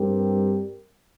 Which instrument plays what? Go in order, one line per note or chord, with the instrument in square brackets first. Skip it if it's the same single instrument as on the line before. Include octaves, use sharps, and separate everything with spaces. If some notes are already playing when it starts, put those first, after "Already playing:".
Already playing: [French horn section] G2 G3 C4 G4 A#4